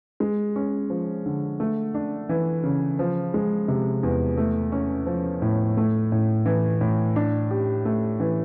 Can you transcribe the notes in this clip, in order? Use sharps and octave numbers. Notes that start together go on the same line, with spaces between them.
G#3
C#4
F3
D3
A3
D4
E3
C#3
F3
G#3
C3
E2
A3
C#4
F3
A2
A3
A2
E3
A2
D4
G4
A3
E3